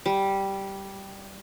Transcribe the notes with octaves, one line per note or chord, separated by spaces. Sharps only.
G3